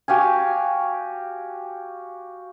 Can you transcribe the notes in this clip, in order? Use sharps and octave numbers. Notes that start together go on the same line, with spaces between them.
F#4 G4 F5 G#5